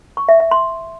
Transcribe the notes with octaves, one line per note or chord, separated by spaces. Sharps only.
C#6
E5
E5
C6